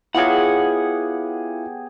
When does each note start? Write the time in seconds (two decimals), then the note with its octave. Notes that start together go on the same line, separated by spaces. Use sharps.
0.15 B3 E4 F4 G4 G#4 C#5 F5 F#5